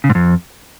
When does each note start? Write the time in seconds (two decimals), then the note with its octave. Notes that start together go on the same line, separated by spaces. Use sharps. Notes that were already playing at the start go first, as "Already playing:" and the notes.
0.04 C#3
0.10 G#2
0.15 F2